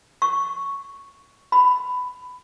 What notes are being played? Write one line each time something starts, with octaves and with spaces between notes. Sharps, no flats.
C#6
B5